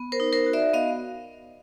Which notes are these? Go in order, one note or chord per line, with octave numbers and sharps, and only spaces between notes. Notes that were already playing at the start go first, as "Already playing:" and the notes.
Already playing: B3
A#4 C5
D#4
A#4 C5
F#4
D5 E5
B3 D#5 F5